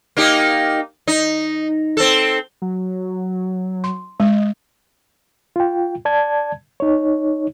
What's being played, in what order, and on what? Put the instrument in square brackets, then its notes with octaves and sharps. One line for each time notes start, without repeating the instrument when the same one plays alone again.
[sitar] A#3 D#4 G4
D#4
C4 A4
[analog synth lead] F#3
[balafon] C6
[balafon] G#3 [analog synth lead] D#5
[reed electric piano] F4 G5
D5 A5 G#6
D#4 C#5